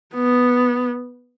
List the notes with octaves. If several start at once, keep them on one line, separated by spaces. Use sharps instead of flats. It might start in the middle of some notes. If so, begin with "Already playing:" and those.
B3